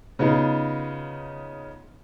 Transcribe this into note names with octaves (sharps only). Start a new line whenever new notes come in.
C#3 B3 D#4 F4